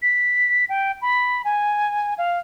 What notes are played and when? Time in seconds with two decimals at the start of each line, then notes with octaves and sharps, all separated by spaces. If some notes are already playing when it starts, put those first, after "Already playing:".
0.02 B6
0.69 G5
1.02 B5
1.45 G#5
2.18 F5